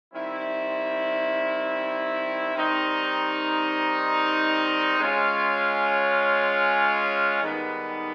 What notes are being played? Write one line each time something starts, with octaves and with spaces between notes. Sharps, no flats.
D#3 G3 C4 E4
D#3 G3 C4 D#4
G#3 C#4 F4
G#2 D#3 G3 B3